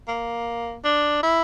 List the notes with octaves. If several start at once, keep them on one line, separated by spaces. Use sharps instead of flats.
A#3
D4
E4